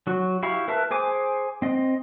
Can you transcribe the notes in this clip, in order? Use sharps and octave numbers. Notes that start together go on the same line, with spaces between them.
F#3 F#4
E4 G4 F5 B5 C#6
A#4 B4 E5 A5
G#4 C5 G#5 D6
C4 D#5